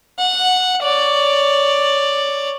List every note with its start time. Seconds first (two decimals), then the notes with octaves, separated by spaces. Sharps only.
0.18 F#5
0.82 C#5 D5